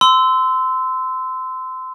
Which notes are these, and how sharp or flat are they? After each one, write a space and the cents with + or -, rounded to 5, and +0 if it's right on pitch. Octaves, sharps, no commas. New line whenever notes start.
C6 -25 E6 -10